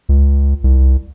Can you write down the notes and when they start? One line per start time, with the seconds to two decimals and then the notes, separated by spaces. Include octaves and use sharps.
0.09 C#2
0.64 C2